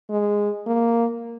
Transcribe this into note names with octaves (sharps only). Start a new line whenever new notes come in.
G#3
A#3